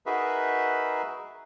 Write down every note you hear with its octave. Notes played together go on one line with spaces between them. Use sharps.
D#4 F#4 G#4 A#4 B4 E5